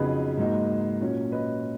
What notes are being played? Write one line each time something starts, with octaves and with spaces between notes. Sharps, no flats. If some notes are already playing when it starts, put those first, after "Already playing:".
Already playing: F2 C#3 F#3 B3 D#4 G#4 B4
G#2 F#3 A#3 D#4
A#2 F#3 C#4
B4 D#5